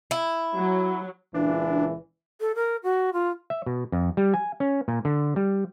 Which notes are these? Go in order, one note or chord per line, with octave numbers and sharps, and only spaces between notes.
E4
F#3
C#2 A#2 E3 D4
A4
A#4
F#4
F4
E5
B2
F2
G3
G#5
C#4
A#2
D3
G3